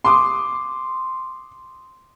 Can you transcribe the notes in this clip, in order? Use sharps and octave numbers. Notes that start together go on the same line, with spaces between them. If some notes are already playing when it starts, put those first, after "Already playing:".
C6 D6 D#6